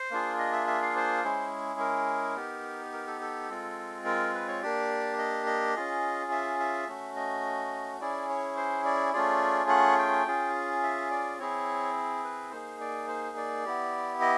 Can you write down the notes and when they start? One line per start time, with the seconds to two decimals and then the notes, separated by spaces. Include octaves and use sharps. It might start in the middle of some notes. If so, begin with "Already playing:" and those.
Already playing: C5
0.11 A#3 D4 F4 G#4
0.39 D#5
0.53 E5
0.67 E5
0.82 F5
0.96 C5
1.24 G#3 C#4 E4 G#4
1.80 A#4
2.36 B3 D#4 G4
2.93 A#4
3.07 A4
3.21 A4
3.49 G#3 C4 F4
4.05 A#4
4.34 B4
4.48 C#5
4.62 A#3 D4 G4 D5
5.18 D#5
5.46 D#5
5.75 C#4 F4 G#4
6.32 E5
6.60 E5
6.87 A3 C#4 F#4
7.16 D#5
8.01 C#4 E4 G#4 D5
8.29 C#5
8.56 C5
8.85 D5
9.13 A3 C#4 F4 G#4 D5
9.69 F#5
9.99 G5
10.26 C#4 F4 G#4
10.83 E5
11.11 D5
11.39 C4 E4 G#4 C#5
12.24 B4
12.51 A#3 D#4 G#4 C5
12.81 D5
13.08 C5
13.37 D5
13.65 B3 E4 G4
14.21 D#5